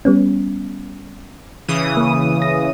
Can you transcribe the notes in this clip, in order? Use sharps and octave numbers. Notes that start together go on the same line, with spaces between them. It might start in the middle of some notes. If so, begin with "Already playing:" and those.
G3 B3 C#4
C#3 E3 D#6
A#3
A#6